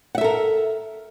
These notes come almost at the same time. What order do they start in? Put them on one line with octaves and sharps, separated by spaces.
F#5 E5 A4 A#4